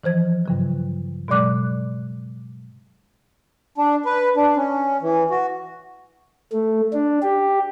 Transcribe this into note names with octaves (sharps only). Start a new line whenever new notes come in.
E3 F3 C5 G#6
G2 C#3 F#3
B2 F#3 G#3 D5 D6 F#6
D4
B4
D4
C#4
E3
F#4
A3
D4
G4